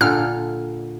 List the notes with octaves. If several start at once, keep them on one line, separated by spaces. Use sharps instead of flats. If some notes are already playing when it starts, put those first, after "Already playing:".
A#2 D3 A4 F6